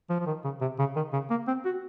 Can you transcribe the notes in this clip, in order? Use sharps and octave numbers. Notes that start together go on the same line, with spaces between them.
F3
F3
D#3
C#3
C3
C#3
D#3
C#3
A#3
C4
F#4